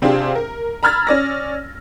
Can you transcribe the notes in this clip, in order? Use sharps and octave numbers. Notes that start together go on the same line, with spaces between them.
C3 C4 D4 F4 G4 G#4
A#4
A#5 B5 E6 F6 G#6 A6
C#4 D5 A#6